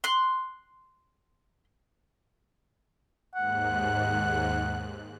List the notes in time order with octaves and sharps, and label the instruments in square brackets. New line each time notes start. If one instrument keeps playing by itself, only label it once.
[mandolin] C6 F#6
[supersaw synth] D#2 G#2 F#6 [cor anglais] F#5